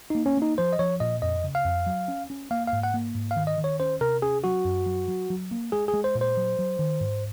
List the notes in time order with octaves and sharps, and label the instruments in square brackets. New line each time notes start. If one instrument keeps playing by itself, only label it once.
[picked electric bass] A#3 [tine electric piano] D#4
[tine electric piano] C#4
[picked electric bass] A#3 [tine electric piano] D#4
[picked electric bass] F3 [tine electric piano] C5
[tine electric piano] D#5
[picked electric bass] F3 [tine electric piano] C#5
[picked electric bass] A#2 [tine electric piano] D#5
[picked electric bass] F2 [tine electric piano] D#5
[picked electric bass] C#3
[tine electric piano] F5
[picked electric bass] F2
F#3
C#4
C#4
[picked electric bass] A#3 [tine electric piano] F5
[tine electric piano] F5
[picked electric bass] G#2
[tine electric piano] F#5
[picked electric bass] A#3
G#2
[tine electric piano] F5
[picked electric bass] D#3
[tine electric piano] D#5
[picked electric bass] D#3
[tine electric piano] C#5
[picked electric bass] C#4 [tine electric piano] C5
[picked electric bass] C3 [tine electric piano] A#4
[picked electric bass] C#4 [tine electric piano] G#4
[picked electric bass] F#3 [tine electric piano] F#4
[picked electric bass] F#2
F#3
F#3
F#3
A#3
[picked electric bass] G#3 [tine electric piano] G#4
[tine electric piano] G#4
[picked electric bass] G#3
[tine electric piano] C5
[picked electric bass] A#2
[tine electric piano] C5
[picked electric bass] F#3
F#3
D#3
G#2